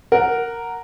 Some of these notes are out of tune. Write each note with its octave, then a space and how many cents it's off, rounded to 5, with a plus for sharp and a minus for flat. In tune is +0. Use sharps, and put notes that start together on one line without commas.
A#4 -5 F#5 +0